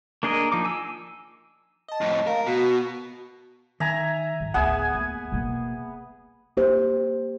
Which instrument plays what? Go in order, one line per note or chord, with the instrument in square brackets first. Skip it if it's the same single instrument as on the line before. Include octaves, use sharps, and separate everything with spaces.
[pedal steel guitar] A#3 D4 G#4 A#4 D#5
F3 D#4 D6
G#5 E6
[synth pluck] D#5 A5
[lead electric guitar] F2 A2
[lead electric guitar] A#4 [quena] F5
[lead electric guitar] B2 [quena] F#4
[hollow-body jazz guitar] D#3 [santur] E5 G#5 A#5
[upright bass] G#2
[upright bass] A1 D2 [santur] B3 G#4 G#5 [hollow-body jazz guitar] E5 F#5
[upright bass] D#2
B2 A#3
[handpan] A#3 G4 C5